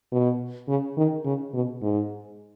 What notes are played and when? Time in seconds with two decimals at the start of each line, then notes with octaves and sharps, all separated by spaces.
0.12 B2
0.69 C#3
0.97 D#3
1.25 C#3
1.54 B2
1.82 G#2